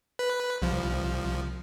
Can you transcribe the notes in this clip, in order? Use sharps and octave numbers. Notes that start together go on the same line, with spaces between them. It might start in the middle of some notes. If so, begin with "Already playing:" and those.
B4
C2 F3